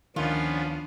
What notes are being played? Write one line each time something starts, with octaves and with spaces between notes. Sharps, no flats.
D2 D#3 F3 B3 C#4 D4 F4 F5